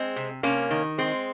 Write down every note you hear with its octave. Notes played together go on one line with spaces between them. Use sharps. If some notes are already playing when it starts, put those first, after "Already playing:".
Already playing: G#3 C4
C3
C3 A#3 C#4
D#3
G#3 C4